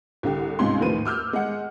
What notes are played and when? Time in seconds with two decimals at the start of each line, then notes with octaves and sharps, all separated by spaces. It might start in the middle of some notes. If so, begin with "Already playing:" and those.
0.23 C2 D3 G4
0.59 C#2 G#2 C3 C#4 C6
0.80 D#2 A2 D#3 F3 B4 D#7
1.05 D6 E6 F6 G6
1.33 G#3 F#5